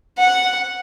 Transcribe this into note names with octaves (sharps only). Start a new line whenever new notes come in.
F#5